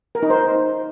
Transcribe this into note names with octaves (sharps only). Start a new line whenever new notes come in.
A#4
D#4
C5